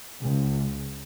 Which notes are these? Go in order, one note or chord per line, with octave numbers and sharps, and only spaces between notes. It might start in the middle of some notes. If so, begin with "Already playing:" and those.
C#2